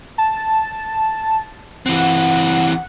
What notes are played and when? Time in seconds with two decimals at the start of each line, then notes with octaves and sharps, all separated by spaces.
0.18 A5
1.86 E3 C4 F#5